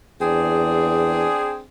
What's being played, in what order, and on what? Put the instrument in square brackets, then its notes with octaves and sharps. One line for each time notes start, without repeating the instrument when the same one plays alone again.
[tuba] E2 [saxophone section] C4 D4 G#4